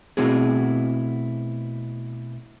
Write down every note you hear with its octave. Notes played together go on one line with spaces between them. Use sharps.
B2 A3 C4 E4 F#4 G#4